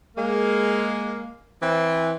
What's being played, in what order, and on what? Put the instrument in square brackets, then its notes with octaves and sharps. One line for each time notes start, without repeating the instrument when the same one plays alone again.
[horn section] G#3 A#3
E3 C4